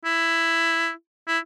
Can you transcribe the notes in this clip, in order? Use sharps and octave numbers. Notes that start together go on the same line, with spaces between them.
E4
E4